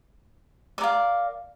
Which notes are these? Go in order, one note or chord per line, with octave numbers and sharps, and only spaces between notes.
A#4 D5 F5